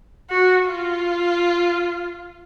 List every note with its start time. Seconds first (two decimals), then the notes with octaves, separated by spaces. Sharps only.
0.30 F#4
0.68 F4